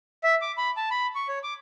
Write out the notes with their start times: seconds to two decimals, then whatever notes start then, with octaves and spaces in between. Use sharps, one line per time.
0.24 E5
0.42 D6
0.58 B5
0.77 A5
0.91 B5
1.15 C#6
1.29 C#5
1.43 D6